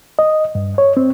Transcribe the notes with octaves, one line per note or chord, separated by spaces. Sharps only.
D#5
G2
C#5
C4